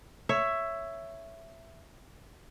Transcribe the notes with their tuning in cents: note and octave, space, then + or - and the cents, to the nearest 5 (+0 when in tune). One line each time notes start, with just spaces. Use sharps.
C#5 +0 E5 +10